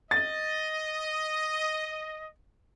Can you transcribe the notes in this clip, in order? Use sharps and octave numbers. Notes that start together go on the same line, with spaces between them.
D#5 A6